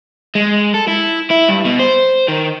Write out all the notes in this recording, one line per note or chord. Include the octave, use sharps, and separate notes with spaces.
G#3
A4
E4
E4
G2
B2
C5
D#3